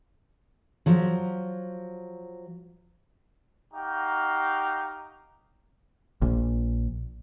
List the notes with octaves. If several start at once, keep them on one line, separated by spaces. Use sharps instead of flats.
F3 F#3
D#4 F#4 G4 F5
A#1